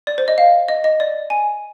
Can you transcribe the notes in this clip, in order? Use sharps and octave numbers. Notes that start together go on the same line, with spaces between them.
D5
C5
D#5
F5
D#5
D#5
D5
G#5